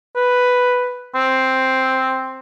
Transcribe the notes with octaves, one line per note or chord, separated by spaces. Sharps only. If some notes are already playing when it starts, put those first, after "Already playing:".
B4
C4